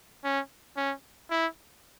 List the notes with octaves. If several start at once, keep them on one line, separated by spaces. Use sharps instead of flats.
C#4
C#4
E4